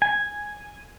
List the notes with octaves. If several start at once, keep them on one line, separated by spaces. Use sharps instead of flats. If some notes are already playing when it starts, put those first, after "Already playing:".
G#5